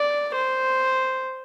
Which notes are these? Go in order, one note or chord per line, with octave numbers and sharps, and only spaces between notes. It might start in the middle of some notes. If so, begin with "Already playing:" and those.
Already playing: D5
C5